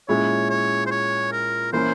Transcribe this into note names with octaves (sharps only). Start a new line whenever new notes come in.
A#2 G#3 C#4 E4 C#5
C#5
C5
C#5
A#4
E3 A#3 C#4 E4 C5